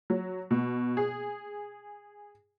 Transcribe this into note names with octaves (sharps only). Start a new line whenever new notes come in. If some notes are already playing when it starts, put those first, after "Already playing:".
F#3
B2
G#4